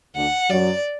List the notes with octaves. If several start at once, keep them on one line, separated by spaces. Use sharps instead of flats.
D2 D3 F#5
F#2 F#3 D5